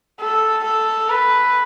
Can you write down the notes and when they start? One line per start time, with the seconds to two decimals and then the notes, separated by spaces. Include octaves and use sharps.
0.20 A4
0.64 A4
1.10 B4